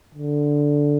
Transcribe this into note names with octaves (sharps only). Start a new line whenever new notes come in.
D3